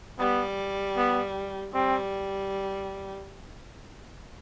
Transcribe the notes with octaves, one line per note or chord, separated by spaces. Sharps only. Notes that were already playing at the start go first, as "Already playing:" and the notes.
G3 B3
B3
G3 C4